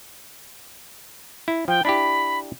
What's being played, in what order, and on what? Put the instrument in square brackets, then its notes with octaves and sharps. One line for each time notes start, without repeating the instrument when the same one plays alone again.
[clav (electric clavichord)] E4
[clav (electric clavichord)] F3 [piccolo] G5
[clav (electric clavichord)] D4 E4 G4 [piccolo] B5